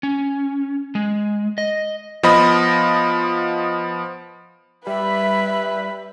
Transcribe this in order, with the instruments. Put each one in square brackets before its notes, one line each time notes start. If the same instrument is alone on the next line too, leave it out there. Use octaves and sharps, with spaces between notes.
[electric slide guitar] C#4
G#3
D#5
[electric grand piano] F3 B3 D#5 B5 A#6
[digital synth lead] G3 [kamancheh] B4 B5 [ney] E5